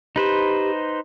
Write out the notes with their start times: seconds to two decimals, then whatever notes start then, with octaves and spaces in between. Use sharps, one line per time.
0.16 D#4 G4 B4 C5